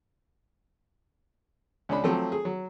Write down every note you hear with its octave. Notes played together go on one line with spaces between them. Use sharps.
C#2 C#4 D4 B5
F3 F#3 A3 C4
G#4
F#3